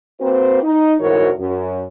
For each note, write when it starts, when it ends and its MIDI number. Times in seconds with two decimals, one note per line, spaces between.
0.21 0.63 58
0.21 0.63 60
0.21 0.63 66
0.21 0.63 71
0.21 0.63 72
0.63 0.94 63
1.01 1.30 38
1.01 1.30 44
1.01 1.30 52
1.01 1.30 66
1.01 1.30 70
1.01 1.30 73
1.39 1.84 42